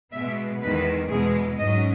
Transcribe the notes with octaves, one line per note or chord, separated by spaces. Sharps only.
B2 G#3 B3 E5
E2 D#3 G#3 B4
E2 B2 G#3 G#4
G#2 F#3 C#4 D#5